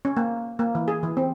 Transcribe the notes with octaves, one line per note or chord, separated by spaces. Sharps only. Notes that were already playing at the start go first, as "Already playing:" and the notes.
C#4
A#3
A#3
E3
G#4
E3
C4